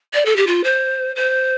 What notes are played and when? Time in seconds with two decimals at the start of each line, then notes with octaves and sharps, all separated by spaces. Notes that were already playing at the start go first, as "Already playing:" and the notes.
0.14 D5
0.25 A4
0.36 G4
0.47 F4
0.64 C5
1.16 C5